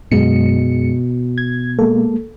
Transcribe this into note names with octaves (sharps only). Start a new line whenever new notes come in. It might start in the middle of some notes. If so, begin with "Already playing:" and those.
F#2 B2 G#3 C#7
G#6
G#3 A#3 A4